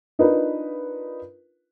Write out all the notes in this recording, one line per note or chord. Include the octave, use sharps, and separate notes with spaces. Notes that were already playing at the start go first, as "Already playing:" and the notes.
D4 D#4 F4 A#4 B4